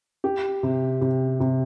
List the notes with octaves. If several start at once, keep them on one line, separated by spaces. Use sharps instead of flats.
G4
C3
C3
C3